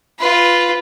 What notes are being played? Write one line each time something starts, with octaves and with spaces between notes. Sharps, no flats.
F4 B4